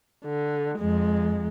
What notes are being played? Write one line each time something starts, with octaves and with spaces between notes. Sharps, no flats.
D3
F2 G#3